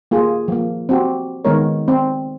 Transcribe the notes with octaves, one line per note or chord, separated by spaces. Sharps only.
A#3 F4 G4 G#4
F3 A#3
C4 F#4 G4
D#3 G#3 B3 D#4 A#4 C#5
C4